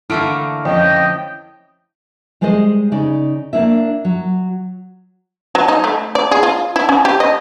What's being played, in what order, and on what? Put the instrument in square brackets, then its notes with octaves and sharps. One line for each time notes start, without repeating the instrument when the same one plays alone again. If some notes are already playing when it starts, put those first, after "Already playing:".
[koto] D3 A3 A#3 [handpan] E4 [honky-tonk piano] F6 D7
[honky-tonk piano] F2 C#4 [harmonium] D#5 G5
[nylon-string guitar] G3 G#3 G#4 C5 C#5 D#5
C#3 D#4 D5
A#3 D4 E4 E5
F#3
[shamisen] F#3
D#4
A3
D5
G#4
F4
E4
C#4
G4
D#5